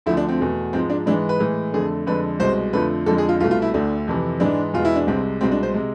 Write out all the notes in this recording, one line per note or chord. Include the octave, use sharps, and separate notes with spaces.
D2 D3 F3 A3 E4
D4
C4
E2 B2 A3
G#2 F3 G#3 C4
D4
G#2 E3 G#3 D4
B4
A2 E3 G#3
F2 D3 A3 G#4
F2 D3 G#3 B4
C2 B2 G#3 C5
F2 D3 F3 A3 B4
F2 D3 F3 G#3 A4
G#4
F4
C2 B2 A3 F4
F4
E4
D2 D3 A3 D4
F2 C3 E3
G#2 E3 G#3 D4
E2 B2 G#3 F4
E4
D4
C2 C3 G#3 C4
C2 B2 G#3 C4
D4
C5
C3 G#3